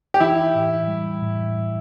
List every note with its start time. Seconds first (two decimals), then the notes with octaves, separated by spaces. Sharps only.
0.14 G4
0.20 E3 E4
0.54 A2
0.88 G3
1.21 A2